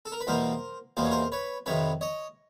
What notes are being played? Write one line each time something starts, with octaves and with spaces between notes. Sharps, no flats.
A4
A#4
B4
E2 B2 G3 A#3 A#4 C5
E2 B2 G3 A#3 C5
C#5
A#4 C5
B4 C#5
F2 C3 D#3 B4 C#5
C#5 D#5